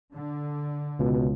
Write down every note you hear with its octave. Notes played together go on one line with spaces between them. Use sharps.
D3
C#2 B2